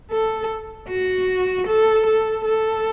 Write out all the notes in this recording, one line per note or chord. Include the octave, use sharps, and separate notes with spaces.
A4
F#4
A4
A4
A4